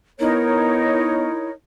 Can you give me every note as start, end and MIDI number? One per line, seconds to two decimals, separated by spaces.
0.20 1.26 59
0.20 1.51 63
0.20 1.48 64
0.20 1.51 70
0.20 1.51 73